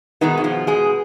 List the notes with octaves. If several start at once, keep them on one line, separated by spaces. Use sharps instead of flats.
B2 D#3 G#3 B3 D#4
F#4
F3 F4
G#3 G#4